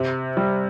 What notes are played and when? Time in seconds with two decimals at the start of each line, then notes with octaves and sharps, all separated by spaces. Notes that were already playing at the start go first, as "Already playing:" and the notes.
Already playing: C3
0.37 G3